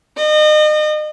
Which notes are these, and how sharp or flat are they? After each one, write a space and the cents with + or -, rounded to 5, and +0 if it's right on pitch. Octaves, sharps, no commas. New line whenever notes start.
D#5 -35